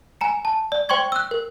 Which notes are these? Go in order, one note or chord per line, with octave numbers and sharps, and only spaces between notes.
G#5 A#5 C#7
A5
D5
C5 G5 C6 C#6 G#6
E6 F#6
A#4